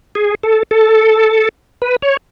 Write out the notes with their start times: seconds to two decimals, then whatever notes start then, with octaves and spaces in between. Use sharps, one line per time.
0.15 G#4
0.43 A4
0.71 A4
1.82 B4
2.02 C#5